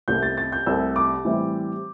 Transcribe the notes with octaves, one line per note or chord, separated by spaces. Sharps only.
C2 C3 A3 G6
A6
A6
G6
C2 C3 A3 E6
D6
A2 E3 G3 C4 E4